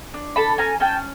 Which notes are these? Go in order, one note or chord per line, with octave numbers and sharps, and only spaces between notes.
D4
A4 A5 B5
C#4 G#5 A#5
C#4 G5 A5